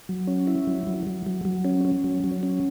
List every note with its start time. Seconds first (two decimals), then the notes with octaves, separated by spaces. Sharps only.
0.09 F#3
0.27 C#4
0.47 E4
0.67 F#3
0.87 F#3
1.07 F#3
1.26 F#3
1.45 F#3
1.65 C#4
1.85 C#4
2.04 F#3
2.24 F#3
2.43 C#4